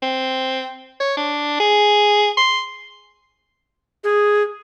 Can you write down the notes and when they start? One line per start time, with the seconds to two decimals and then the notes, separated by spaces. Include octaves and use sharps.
0.02 C4
1.00 C#5
1.17 D4
1.60 G#4
2.37 C6
4.04 G#4